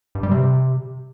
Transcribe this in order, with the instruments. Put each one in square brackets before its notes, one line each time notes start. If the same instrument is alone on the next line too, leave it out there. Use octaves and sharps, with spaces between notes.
[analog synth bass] G2
G3
C3